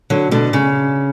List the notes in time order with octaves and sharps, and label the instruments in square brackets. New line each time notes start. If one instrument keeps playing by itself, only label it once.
[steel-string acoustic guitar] D3 F#3
B2 D3
C#3